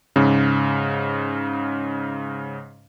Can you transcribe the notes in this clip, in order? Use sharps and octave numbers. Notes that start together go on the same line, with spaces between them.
G#2 C#3